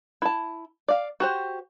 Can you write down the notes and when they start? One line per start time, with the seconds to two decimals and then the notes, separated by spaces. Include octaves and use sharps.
0.22 E4 A5
0.88 D5 F5
1.20 F#4 G4 C5